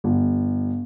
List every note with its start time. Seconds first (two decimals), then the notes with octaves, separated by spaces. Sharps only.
0.04 G1